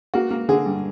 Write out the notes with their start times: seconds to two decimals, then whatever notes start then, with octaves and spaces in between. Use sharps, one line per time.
0.14 A#3 F#4
0.31 A#3
0.49 D3 G#4
0.66 G2